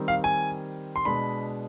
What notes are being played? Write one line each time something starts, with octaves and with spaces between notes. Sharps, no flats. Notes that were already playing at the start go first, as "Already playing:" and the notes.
Already playing: D#3 G3 C4
F5
G#5
C6
B2 G#3 D4 B5